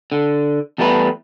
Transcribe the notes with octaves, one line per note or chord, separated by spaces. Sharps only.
D3
E2 G3 A3 E4 B4